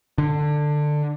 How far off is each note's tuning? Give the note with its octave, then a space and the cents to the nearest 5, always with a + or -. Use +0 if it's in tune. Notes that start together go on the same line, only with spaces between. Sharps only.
D3 +15